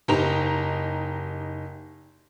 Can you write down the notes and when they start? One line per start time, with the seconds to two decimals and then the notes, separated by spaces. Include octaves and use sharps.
0.08 F#1 D#4 G4 A#5 F7